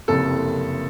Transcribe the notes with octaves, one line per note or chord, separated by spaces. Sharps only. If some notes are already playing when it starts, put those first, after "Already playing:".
F#1 F2 C3 A4